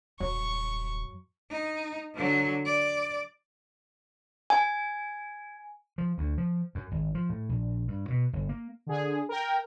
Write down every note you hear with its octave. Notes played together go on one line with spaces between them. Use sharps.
D#1 F#2 F#3 C#6
D#4
D3 F#3
D5
G#5
F3
D2
F3
F#2
G#1
F3
A2
A#1
G2
B2
G1
A#3
D3 G#4
A#4 G5